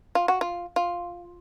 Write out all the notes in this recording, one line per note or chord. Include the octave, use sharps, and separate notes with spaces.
F4
F#4
F4
F4